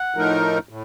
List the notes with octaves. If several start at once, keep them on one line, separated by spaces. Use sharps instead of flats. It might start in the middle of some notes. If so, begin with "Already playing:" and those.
Already playing: F#5
A2 F3 A3 D#4 A#4
A2